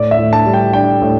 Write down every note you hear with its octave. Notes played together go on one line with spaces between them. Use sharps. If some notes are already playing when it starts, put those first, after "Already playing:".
Already playing: A2 D5
E5
A2
A5
G3
G5
D4 G5
A2